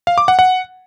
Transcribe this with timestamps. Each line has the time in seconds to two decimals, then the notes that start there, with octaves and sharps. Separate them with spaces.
0.07 F5
0.18 D6
0.28 F#5
0.39 F#5